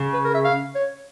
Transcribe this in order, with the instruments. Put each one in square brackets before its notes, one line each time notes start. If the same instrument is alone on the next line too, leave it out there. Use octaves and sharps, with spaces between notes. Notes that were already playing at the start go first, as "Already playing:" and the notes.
Already playing: [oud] C#3
[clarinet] B4
A#4
E5
F5
C#5